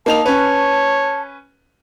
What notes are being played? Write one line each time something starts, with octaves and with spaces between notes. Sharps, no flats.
A#3 D#4 A5 F7
C#4 B4 C#5